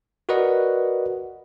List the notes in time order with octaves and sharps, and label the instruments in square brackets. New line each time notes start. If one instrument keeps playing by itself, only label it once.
[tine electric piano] F#4 A#4 B4 D5 D#5 F#5